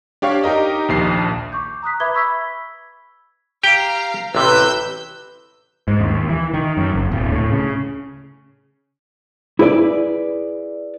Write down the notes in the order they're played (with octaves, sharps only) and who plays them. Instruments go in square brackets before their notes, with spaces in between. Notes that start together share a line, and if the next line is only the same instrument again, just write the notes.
[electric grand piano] D4 G4 C#5 F5
D#4 G4 A#4 D#5
A#1 D#2 C7
[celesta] C#6 D6 G6
A#5 D#6 F#6 B6
B4 E5 B5 D6 G#6 G7
B5 C#6 E6 G#6 B6
[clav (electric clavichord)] G4 G5 [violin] F5 A#5
[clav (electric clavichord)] A1 C3 [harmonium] B4 [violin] E6 G6
[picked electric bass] G#2
D#2
E3
D#3
F#2
F#1
D1
A2
C#3
[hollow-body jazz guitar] E4 G#4 B4 D5